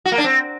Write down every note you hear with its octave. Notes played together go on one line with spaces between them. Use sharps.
F#4
A#3
D4
C4